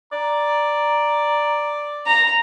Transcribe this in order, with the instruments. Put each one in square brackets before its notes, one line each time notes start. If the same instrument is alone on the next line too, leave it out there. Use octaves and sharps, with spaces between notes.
[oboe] D5 [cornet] A#5
[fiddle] A#5